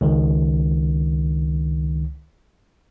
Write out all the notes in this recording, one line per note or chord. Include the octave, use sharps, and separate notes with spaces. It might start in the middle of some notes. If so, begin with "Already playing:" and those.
C#2 D#3